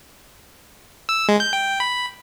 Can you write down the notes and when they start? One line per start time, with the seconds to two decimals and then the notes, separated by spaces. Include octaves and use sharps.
1.09 E6
1.29 G#3
1.40 G6
1.53 G5
1.80 B5